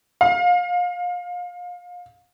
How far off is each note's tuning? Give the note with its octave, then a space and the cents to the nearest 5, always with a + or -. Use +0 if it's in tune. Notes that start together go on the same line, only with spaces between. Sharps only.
F5 +25